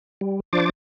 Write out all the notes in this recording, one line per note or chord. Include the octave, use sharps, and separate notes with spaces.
G3
F3 D4 C5 D6 A6